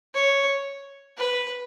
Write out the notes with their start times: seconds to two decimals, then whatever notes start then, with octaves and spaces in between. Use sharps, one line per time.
0.15 C#5
1.18 B4